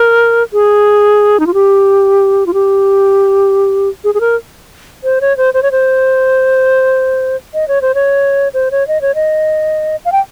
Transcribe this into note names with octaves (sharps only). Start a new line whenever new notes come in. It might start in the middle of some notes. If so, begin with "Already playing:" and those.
Already playing: A#4
G#4
D#4
F4
G4
F4
G4
G#4
G#4
A#4
C5
C#5
C5
C5
C#5
C5
D#5
C#5
C5
C#5
C5
C#5
D#5
C#5
D#5
F5
G5